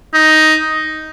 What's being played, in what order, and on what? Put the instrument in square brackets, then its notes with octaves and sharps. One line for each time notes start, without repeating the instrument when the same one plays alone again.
[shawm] D#4